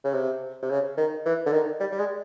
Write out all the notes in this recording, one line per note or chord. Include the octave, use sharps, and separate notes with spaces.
C#3
C3
C3
C#3
D#3
E3
D3
D#3
G3
G3
G#3